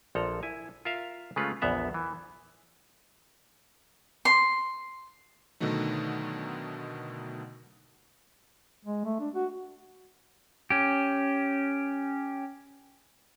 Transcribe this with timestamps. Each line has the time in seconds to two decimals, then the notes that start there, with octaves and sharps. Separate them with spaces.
0.15 A#1 F3 A4 A#5
0.43 E4 G#5
0.85 F4 A#4 E5 F5
1.36 C#3 G#3 A3 C#4 F4 B4
1.62 A#1 E2 B3 E5 A#5
1.94 E3
4.25 C6
5.60 B2 D3 D#3 F#3 A3 D#4
8.86 G#3
9.05 A3
9.20 D4
9.35 F#4
10.70 C#4 G4